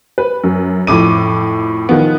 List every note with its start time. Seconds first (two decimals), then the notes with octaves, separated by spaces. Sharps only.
0.18 B4
0.44 F#2
0.87 F2 A2 D6 D#7
1.89 D#3 F3 B3